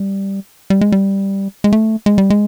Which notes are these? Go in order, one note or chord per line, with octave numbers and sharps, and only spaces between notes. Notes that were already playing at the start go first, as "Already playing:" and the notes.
Already playing: G3
G3
G#3
G3
G#3
A3
G#3
G3
G#3